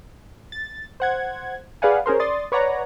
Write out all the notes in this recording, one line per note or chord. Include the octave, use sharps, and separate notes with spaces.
A6
C5 F#5 G#6
G#4 B4 D5 F5 F#5 G#5
C#4 G#4 A#4 C5
D5 C6 D#6 A6
B4 C#5 D5 F#5 A#5